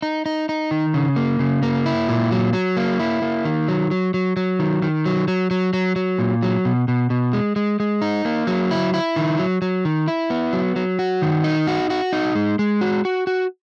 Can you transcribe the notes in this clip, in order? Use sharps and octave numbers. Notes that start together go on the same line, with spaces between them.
D#4
D#4
D#4
D#3
C#3
A#3
C#3
A#3
E4
A#2
F#3
F#3
A#3
E4
A#3
D#3
F#3
F#3
F#3
F#3
D#3
D#3
F#3
F#3
F#3
F#3
F#3
A#2
F#3
B2
B2
B2
G#3
G#3
G#3
D#4
A#3
F#3
E4
E4
D#3
F#3
F#3
D#3
E4
B3
F#3
F#3
F#4
D#3
D#4
F#4
F#4
D#4
G#3
G#3
F#4
F#4
F#4